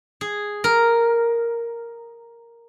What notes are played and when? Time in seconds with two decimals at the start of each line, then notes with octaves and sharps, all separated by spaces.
0.21 G#4
0.64 A#4